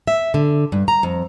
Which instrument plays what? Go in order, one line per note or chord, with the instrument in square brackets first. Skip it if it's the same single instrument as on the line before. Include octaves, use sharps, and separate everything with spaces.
[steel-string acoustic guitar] E5
D3
G2
A#5
F2